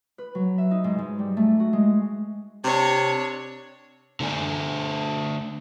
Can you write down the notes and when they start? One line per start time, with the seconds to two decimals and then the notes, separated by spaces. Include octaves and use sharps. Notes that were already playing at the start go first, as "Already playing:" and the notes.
0.18 B4
0.35 F#3
0.58 E5
0.71 D#4
0.84 G#2
0.99 G#2
1.19 G3
1.37 A3
1.60 F#4
1.73 G#3
2.64 C3 D4 C#5
4.20 D3 A3 D4 G#5